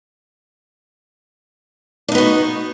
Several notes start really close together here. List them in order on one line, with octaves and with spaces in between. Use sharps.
D4 D#4 B3 F#4